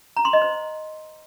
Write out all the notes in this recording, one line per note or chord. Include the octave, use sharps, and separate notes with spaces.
A#5
C6
D#5
C5